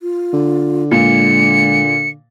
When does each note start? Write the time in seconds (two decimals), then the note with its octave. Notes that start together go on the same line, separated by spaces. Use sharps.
0.01 F4
0.33 D3
0.92 A#2 G#3 C#7